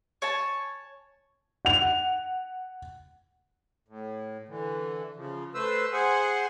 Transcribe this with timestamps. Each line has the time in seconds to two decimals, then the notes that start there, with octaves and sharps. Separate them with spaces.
0.22 C#5 G#5 A5
1.65 F#5 F7
3.88 A2
4.48 D3 E3
5.16 C#3 F3
5.55 A3 B4 C5 E6
5.93 G#4 C5 F#5 G#5